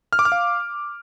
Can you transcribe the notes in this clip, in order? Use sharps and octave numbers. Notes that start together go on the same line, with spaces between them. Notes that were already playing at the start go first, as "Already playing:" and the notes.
F6
D6
F6
F5